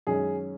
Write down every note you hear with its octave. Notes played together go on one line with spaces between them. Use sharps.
F#2 D#3 G#3 C#4 G#4